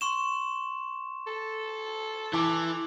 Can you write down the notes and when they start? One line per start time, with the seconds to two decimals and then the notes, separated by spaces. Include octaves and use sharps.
0.01 C6 C#6 E7
1.27 A4
2.34 E3 A5 D6